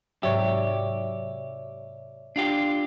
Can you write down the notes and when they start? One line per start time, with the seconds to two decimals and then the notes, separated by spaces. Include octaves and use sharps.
0.23 G#2 C3 F#3 G4 C#5 D5 E5
2.36 D4 F4 G4